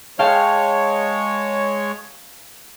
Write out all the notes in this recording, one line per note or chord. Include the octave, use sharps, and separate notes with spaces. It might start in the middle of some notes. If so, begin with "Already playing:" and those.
G#3 C#5 F5 G5 A5